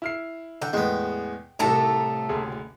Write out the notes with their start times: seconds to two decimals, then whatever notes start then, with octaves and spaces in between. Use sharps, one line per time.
0.02 E4 F6 C7
0.62 D3 G5
0.73 E2 A2 G#3 B3
1.59 C2 A2 A3 D#4 A4 A5 A#5
2.29 F#1 D2 G#4